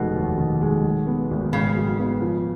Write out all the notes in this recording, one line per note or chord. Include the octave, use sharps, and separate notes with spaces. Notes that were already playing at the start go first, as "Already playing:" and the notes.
Already playing: F1 B2 D#3 G#3
D#2
D#3
G#3
F#3
B3
G#1
G#2 C#3
F#3
B3
F3